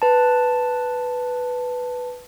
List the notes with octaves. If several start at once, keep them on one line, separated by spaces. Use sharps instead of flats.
B4 A5